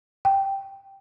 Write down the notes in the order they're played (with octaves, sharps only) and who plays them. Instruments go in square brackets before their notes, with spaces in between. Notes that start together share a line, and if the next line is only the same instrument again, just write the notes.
[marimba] G5